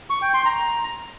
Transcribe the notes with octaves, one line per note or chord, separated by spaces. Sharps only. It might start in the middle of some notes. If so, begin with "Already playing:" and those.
C#6
G5
C6
A#5